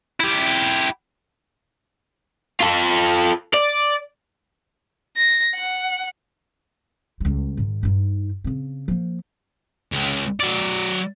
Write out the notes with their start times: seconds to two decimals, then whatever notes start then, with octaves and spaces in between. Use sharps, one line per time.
0.20 E4 G4
2.60 F4 A4
3.54 D5
5.17 A#6
5.54 F#5
7.20 C#2 G3
7.57 G#2 D#3
7.83 G2 D#4
8.44 C#3 C4
8.88 F3 A#3
9.92 C#2
10.40 F#3 D5